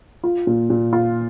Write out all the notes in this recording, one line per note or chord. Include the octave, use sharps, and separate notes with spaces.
F4
A#2
A#2
F4